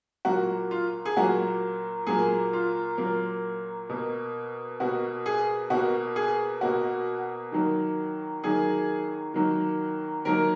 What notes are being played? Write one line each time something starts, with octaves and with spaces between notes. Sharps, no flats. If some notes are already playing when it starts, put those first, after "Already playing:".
A#2 F#3 A#3 F#4
F4
G#4
A#2 F#3 A#3 F#4
A#2 F#3 A#3 G#4
F4
A#2 F#3 A#3
B2 A#3
B2 A#3 F#4
G#4
B2 A#3 F#4
G#4
B2 A#3 F#4
D#3 F#3 A#3
D#3 F#3 A#3 G#4
D#3 F#3 A#3
D#3 F#3 A#3 A#4